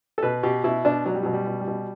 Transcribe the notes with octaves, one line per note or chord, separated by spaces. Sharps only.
A4
B2 B4
B2 G4
B2 E4
B2 D4
B2 F#3
G3
B2 F#3
G3
B2
G3
B2